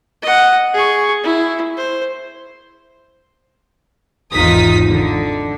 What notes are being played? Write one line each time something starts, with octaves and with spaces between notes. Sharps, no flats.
D#5 F#5
G#4 C#6
E4
C5
G#1 E2 D#4 F4 D#6 B6
D3